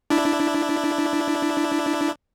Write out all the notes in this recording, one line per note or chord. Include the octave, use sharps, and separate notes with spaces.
D4 E4